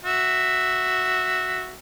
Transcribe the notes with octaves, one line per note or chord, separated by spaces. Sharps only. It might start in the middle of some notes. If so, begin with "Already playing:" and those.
F#4 E5